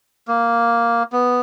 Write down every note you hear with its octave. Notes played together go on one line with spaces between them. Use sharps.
A#3
B3